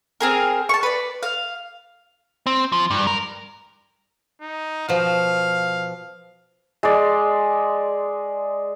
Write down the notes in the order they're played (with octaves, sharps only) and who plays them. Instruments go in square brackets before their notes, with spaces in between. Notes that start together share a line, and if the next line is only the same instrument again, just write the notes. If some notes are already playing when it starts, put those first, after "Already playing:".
[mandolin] C4 G#4 A#4
A5 C#6
B4 D5
F5
[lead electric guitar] C4
F3
G2
A#4
[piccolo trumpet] D#4
[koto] B2 F3 [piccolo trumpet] F5
[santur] G#3 D5